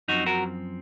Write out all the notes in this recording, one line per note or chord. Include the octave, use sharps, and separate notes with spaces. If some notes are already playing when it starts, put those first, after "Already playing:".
F#2 F3 C4 D#4 F#4
F#4 A#4